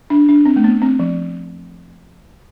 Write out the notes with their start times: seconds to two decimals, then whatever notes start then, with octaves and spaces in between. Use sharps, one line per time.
0.10 D4
0.29 D4
0.45 C4
0.56 A3
0.64 B3
0.82 C4
1.00 F3